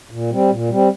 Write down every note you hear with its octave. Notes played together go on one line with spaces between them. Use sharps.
A#2
G3 C4
A#2
G3 C4